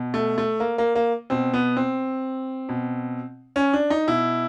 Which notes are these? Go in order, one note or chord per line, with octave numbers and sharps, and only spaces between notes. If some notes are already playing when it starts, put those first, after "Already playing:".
Already playing: B2
A3
A3
A#3
A#3
A#3
B2 C4
B3
C4
B2
C#4
D4
D#4
B2 E4